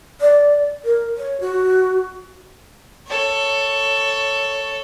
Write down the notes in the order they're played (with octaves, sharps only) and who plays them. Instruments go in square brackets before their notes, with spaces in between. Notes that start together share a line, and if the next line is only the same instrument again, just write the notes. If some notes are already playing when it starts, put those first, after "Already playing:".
[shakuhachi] D5
A#4
C#5
F#4
[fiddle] A4 C#5